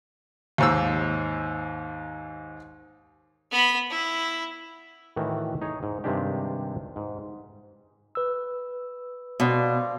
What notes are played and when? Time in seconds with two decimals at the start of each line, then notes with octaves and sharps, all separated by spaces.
0.58 D#2 G#2 E6
3.52 B3 B5
3.90 E4
5.16 A2 D#3 E3 F#4 E5
5.62 D#4 G#4 C#5
5.83 G#2
6.04 G2 C3 D#3 G#3 D4 G4
6.96 G#2
8.15 B4 E6
9.40 B2 C5 D5 F5